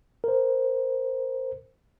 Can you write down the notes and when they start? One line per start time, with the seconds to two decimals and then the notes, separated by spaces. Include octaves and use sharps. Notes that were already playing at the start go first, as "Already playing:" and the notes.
0.24 A#4 C5